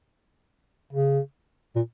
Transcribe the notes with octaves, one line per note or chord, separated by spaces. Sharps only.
C#3
A#2